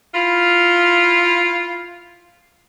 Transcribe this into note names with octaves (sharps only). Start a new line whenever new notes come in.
E4 F4